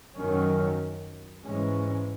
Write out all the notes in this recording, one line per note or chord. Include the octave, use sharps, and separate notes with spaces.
F#2 D#3 F#3 C#4
G#2 E3 G#3 C#4